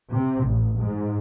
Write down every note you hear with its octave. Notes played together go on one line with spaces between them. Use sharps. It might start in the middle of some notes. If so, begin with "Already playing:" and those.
C3
A1
G#2